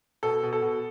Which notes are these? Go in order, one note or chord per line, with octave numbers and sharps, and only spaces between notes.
B2 A4
B2
A4
B2